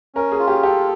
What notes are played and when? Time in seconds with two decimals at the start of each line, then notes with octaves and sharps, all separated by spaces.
0.15 C#4 A#4
0.32 G#4
0.39 F4
0.48 G4
0.63 G4 A4